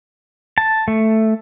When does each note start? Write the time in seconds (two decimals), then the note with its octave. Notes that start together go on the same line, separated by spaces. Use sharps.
0.58 A5
0.88 A3